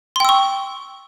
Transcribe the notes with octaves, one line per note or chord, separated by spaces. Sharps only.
G5 C6 C#6 E6